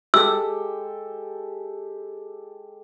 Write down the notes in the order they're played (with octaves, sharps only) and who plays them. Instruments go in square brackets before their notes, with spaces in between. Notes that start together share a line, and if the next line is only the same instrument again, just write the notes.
[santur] G#3 G4 A4 [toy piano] E6